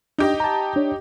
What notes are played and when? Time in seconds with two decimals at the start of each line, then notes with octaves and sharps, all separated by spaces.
0.19 D4 D#4 G4 D#5
0.40 A5 A#5
0.76 D4 C#5